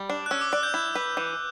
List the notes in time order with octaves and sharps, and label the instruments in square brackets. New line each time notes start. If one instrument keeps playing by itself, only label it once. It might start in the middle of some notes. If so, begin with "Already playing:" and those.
Already playing: [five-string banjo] G3
D4
[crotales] F#6
[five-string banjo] C#4 [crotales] E6
[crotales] D6
[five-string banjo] D5 [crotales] F#6
[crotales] G6
[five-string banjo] E4
B4
E3